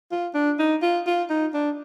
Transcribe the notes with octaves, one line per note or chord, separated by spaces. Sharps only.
F4
D4
D#4
F4
F4
D#4
D4